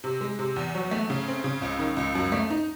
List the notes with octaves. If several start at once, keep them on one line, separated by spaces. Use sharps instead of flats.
C3
G#3
C3
E2
F#3
A3
C#3
C4
C#3
C#2
D#3
C#2
F#2
A3
D#4